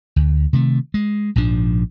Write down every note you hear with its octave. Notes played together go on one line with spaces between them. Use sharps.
D2
C3 D#3 A3
G#3
A#1 G#2 F3 D4